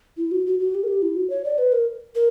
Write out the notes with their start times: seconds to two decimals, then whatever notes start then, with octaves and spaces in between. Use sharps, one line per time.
0.17 E4
0.31 F#4
0.46 F#4
0.59 F#4
0.75 G4
0.83 A#4
0.87 G4
1.02 E4
1.16 F#4
1.30 C#5
1.44 D5
1.58 B4
1.72 A#4
2.15 A#4